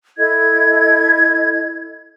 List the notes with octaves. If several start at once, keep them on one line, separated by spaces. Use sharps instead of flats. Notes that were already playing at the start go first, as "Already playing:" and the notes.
E4 A4 D#5 G#6